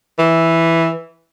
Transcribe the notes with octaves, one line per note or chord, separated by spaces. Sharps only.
E3